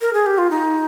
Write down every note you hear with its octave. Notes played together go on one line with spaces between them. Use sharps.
A#4
G#4
G4
F4
D#4